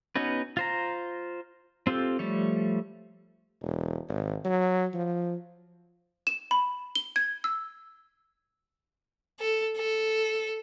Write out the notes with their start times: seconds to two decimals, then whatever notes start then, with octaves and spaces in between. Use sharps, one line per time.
0.16 B3 C#4 D#4 F#4 B4
0.57 F4 C5 A#5
1.87 C4 F4 G4 A4
2.19 F3 G3 A3 C#5
3.62 E1
4.09 G#1
4.45 F#3
4.94 F3
6.27 E7
6.51 B5
6.95 G7
7.16 G#6
7.44 E6
9.40 A4
9.77 A4